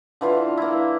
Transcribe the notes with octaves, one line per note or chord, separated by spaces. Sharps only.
D3 E3 F4
A#3 E4